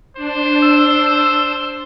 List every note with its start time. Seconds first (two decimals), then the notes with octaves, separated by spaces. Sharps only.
0.16 D4 C5
0.62 E6